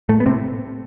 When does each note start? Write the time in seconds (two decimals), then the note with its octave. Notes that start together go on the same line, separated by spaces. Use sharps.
0.09 A2 A3
0.20 B3
0.26 A2 C3 C4